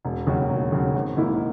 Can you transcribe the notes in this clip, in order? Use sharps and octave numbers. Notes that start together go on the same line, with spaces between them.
E1
D#2 C#3 F#3
E1
D#2 C#3 F#3
G#1
G#2 D#3 A#3 E4